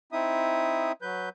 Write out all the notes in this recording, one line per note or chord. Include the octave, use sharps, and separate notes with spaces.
C4 D#4 E4 E5 D#6
F#3 B4 G6